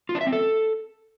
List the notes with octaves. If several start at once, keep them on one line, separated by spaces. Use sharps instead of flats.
F4
D4
E5
C4
A4